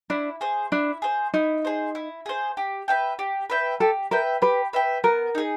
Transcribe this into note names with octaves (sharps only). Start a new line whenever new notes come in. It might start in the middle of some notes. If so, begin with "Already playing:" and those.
D4 E4
G#4 C5
D4 E4
G#4 C5
D#4 E4
G#4 C5
E4
G#4 C5
G4
B4 E5 G5
G4
B4 E5 G5
G4 A4
A#4 B4 E5 G5
G4 B4
B4 E5 G5
B3 A#4
D#4 G#4